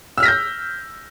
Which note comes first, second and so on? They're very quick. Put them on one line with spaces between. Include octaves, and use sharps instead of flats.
E6 F6 B6 A#6 G6